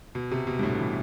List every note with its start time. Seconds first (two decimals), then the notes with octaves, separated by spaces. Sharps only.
0.15 B2
0.31 C3
0.47 B2
0.59 G2
0.63 A2
0.79 E3